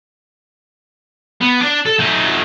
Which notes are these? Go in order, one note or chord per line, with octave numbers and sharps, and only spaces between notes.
B3
D4 D5
A4
A3 D#4